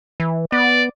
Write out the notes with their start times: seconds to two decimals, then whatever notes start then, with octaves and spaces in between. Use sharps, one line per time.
0.20 E3
0.52 B3 D5